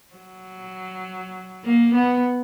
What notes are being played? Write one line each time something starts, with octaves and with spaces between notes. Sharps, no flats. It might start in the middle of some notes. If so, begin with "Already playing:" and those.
F#3
A#3
B3